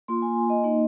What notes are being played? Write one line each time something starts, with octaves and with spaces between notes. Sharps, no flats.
A#3 F4 C6
G#5
D#5
A#3 D#4